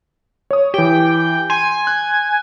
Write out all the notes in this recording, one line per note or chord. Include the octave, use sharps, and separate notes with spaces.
C#5 D#6
E3 G4 G5
G#5 C6
F#6